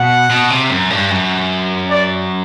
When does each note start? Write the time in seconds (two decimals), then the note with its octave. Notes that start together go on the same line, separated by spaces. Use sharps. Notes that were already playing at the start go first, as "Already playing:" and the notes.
Already playing: B2 F#5
0.30 B2
0.50 C3
0.70 F#2
0.90 G2
1.10 F#2
1.90 D5